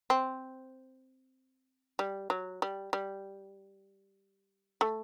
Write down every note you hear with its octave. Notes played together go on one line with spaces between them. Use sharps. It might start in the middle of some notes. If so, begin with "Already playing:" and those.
C4
G3
F#3
G3
G3
A3